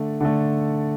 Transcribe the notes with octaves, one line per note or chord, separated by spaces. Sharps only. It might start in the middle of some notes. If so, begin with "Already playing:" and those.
Already playing: D3 A3
D3 A3